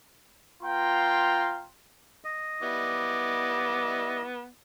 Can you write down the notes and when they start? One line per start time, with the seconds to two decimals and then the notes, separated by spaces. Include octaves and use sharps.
0.63 B3 F4 F5 G5 A#5 C6
2.24 D#5
2.62 G3 B3 E4 D6